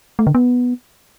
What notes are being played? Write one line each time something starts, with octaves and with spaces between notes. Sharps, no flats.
A3
D3
B3